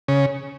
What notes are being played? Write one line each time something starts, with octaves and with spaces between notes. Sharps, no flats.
C#3